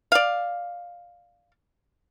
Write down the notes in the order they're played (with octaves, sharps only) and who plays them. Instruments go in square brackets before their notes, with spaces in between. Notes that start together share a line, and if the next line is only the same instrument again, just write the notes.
[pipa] D5 F5